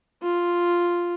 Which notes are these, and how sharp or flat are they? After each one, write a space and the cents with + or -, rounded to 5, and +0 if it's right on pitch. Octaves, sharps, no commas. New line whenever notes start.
F4 +0